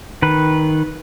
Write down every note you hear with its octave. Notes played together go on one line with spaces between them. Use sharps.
D#3 B4